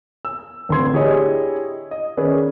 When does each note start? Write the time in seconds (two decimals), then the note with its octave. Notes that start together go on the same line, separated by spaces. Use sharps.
0.25 E6
0.69 D1 D3 C4 C6 G#6
0.93 D4 E4 G4 G#4 C#5 D#5
1.91 D#5
2.17 D#3 C#4 G#4 A#4 B4 D5